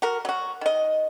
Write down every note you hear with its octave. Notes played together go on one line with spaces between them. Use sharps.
F#4 A#4
F#3 F#4
D#3 D#5